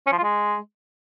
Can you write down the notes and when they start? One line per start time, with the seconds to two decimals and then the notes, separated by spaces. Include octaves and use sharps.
0.07 C#4
0.12 F3
0.18 F4
0.23 G#3